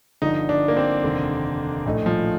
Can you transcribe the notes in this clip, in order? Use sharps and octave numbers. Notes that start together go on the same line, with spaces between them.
G1 G2 D3 F3 D#4
D4
A#3
C4
F1 D#2 D3
A#1 A2 A3 D#4
F3